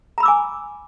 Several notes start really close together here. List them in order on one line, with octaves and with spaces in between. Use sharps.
A#5 B5 E6 D6 G#5